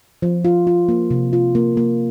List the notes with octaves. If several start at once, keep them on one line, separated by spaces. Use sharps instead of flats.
F3
F4
F4
A#3
C3
F4
A#3
A#3